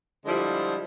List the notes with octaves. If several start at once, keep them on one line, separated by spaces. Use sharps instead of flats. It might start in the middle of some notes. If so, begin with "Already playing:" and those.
D3 F3 G3 G#3 E4 C5